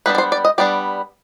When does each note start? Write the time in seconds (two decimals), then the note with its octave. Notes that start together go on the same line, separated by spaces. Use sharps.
0.06 G3 B3 D4 B4
0.15 D5
0.18 C5
0.32 D5
0.45 D#5
0.58 G3 B3 D4 D5